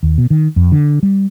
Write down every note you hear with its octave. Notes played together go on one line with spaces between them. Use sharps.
D#2
B2
D#3
F2
D3
G3